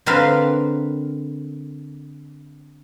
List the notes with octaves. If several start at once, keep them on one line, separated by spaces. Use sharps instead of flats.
D3 C4 A#4 B4 F5